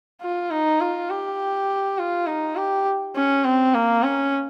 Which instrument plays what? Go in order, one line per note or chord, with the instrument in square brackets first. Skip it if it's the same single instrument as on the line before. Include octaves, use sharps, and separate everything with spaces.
[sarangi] F4
D#4
F4
G4
F4
D#4
G4
C#4
C4
A#3
C#4